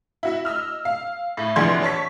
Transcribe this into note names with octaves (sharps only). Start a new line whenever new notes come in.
E4 F#4 E5
D#5 E6 F6
F5
A2
F1 A#1 E3 F#5 C6 G#6
C#5 A5 C#6 B6